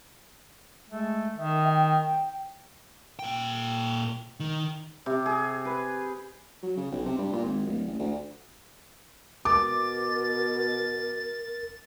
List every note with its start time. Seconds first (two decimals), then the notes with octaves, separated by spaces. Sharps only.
0.89 G#3 A3
1.37 D#3 E5
1.65 G5
3.19 A#2 G5
4.40 D#3
5.06 C3
5.26 G#4
5.65 B4
6.63 F#3
6.77 C#3
6.92 B1
7.05 C3
7.18 G2
7.32 A#2
7.44 G#1
7.66 D1
7.87 A1
7.99 D2
9.45 B2 A#4 D6 A6